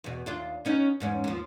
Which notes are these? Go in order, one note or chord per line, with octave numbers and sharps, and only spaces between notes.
E2 B2
D#2 D4 F4
B3 C#4 D#4
E2 G#2 C#4
D#2 F3